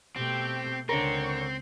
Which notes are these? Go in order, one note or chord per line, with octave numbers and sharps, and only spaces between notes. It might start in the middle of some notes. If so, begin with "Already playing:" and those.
B2 A3 C4 G4
C#2 D3 C4 A#4 C#5